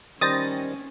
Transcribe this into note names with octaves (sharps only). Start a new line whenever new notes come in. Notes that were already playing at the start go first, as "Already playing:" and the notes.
D#3 G3 C#4 C5 D#6 A6 A#6